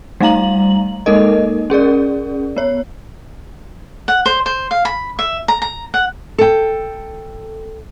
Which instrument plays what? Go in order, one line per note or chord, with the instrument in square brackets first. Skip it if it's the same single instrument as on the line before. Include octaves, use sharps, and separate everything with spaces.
[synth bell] G3 A3 D#4 F5 A#5 F#7
G#3 A#3 D#4 A4 A#4 D#5
C#4 G#4 A#4 D5
B3 C#5
[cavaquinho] F#5
C5
C5
F5
B5
E5
A#5
A#5
F#5
[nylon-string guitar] A4 G5